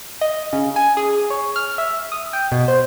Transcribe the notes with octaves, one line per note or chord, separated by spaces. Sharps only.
D#5
C#3
G#5
G#4
C#5
F6
E5
D#6
G5
B2
C5